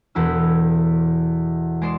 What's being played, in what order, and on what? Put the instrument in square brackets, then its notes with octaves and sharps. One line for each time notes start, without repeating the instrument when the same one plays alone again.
[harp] E1 E2 E4 A4 E6
G#3 D5 C6 C7 E7